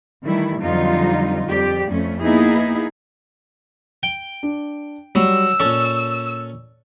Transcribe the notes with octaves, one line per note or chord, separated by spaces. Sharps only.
D#3 E3 G3 A3 E4
F2 D3 F#3 G3 D#4 F4
F2 G3 G4 D5
F2 A3 C#4
A#3 B3 D#4 E4 G#4
G5
D4
F#3 G3 E6
A#2 C#4 A4 C#6